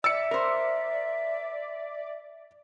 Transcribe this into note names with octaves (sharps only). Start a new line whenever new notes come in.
D5 E5 E6 C#7
A#4 C5